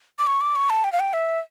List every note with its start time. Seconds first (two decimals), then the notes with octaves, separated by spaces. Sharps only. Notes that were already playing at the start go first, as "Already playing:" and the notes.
0.19 D6
0.27 C#6
0.41 D6
0.56 C#6
0.70 A5
0.84 G5
0.92 F5
1.00 G5
1.13 E5